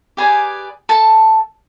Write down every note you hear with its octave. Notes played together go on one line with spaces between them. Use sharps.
G4 G#4 B4 D5 G#5
A4 A5